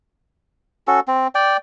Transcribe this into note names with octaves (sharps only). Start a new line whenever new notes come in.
C#4 F#4 A4
C4
D5 G5